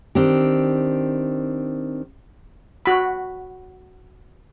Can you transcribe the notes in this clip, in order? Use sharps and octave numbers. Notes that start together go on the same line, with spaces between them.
D#3 C4 D4 G4
F#4 B5